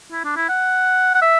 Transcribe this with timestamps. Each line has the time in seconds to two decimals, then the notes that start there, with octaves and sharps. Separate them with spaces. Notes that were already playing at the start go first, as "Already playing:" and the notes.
0.12 E4
0.24 D4
0.36 E4
0.49 F#5
1.14 F#5
1.22 E5